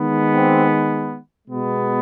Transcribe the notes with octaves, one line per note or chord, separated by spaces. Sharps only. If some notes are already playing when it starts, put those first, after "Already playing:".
Already playing: D#3 G#3 B3
C4
B2 G#3 B3